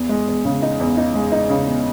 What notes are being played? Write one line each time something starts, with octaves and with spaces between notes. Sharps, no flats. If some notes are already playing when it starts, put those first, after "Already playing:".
Already playing: E2
G#3
E2
C#3
D#4
E2
D#4
G#3
D#4
C#3
E2